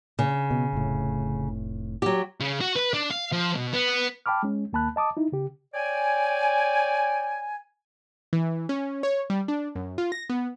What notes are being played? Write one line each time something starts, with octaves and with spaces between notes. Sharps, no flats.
C#3
B2
F1 A2
F#3 G4
C#3
F#4
B4
D4
F5
F3
B2
B3
G5 A5 B5 D6 F6
G#3 C#4
D#2 A#3 A5 B5 F#6
D#5 A5 D6 D#6
D#4 E4
C#3 G4
C#5 D5 G5 G#5
E3
C#4
C#5
G3
D4
F#2
F4
A#6
B3